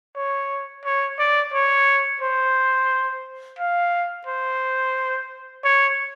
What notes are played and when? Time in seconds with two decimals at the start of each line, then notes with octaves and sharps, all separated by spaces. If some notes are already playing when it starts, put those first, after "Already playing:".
0.16 C#5
0.85 C#5
1.19 D5
1.53 C#5
2.22 C5
3.59 F5
4.27 C5
5.64 C#5